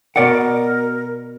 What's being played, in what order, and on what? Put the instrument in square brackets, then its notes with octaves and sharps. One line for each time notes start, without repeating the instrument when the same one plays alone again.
[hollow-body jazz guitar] B2 D5 F#5 [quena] A#4